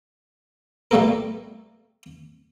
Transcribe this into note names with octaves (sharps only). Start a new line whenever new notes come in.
A#2 G3 A3 A#3 A4 A#4